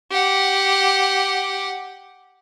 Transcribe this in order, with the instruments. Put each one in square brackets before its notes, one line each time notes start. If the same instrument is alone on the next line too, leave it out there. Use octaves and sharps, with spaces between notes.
[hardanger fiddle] G4 F#5